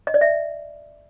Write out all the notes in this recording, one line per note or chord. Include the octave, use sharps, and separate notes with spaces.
D#5
D5
E5